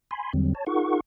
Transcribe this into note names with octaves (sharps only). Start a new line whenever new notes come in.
G#5 B5 C6
E2 D3 F#3 G3 C4
C#5 A5
D#4 F4 G#4 A#4 F#5 C#6